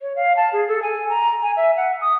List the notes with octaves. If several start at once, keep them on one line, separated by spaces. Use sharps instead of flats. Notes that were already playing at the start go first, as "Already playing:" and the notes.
C#5
F5
A5
G#4
A4
G#5
A#5
G#5
E5
F#5
D#6